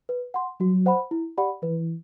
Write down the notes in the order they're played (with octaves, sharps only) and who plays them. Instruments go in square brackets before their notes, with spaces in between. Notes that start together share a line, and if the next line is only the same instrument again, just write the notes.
[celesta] B4
F#5 C6
[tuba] F#3 [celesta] F#4
[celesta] C5 F#5 B5
E4
G4 D5 F#5 B5
[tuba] E3 [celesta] B4